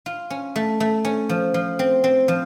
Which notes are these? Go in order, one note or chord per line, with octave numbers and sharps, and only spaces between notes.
F4
C#4
A3
A3
C#4
F3
F3
C4
C4
F3